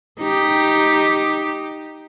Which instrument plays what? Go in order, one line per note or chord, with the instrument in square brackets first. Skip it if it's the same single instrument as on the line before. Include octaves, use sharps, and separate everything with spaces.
[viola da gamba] D#4 G4